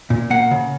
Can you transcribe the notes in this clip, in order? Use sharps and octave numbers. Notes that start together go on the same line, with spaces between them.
A#2
A#3 F#5
C#3